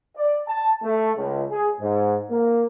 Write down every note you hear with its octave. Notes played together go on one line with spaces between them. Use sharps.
D5
A5
A3
C#2
G#4
G#2
A#3